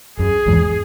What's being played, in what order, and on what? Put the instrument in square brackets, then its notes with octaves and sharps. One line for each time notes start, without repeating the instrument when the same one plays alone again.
[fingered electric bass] F#2 [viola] G#4
[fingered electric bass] E2 G#2